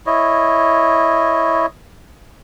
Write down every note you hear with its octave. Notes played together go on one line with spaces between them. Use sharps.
E4 C#5 D#5